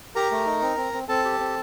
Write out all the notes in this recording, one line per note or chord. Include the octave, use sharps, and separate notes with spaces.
G4 A#4 A#5
A3
D#4
C4
C4
C4
C4 A4 A5
G4
C4